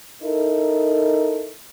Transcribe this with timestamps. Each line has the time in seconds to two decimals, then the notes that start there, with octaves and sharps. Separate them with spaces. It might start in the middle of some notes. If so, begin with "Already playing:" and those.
0.23 D#4 E4 A4 A#4